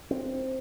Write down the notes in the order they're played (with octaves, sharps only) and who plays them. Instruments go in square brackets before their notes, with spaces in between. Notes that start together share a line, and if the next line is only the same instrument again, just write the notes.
[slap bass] C4